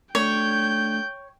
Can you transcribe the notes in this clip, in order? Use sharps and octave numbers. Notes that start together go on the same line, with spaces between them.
A3 D4 C#5 G5 G6